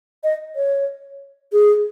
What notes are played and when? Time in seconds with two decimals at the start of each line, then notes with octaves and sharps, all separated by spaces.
0.24 D#5
0.56 C#5
1.53 G#4